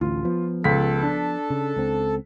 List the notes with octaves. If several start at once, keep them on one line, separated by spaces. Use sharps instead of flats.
A1 D2 F4
F3 B3
C#2 A4 B6
D4
C#3
C#2 C4